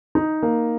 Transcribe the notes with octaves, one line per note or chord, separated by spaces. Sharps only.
D#4
A#3